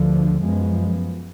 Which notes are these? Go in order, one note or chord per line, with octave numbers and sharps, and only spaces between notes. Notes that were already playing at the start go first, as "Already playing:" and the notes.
Already playing: D2 D3 F3
F#2 F3 G#3 B3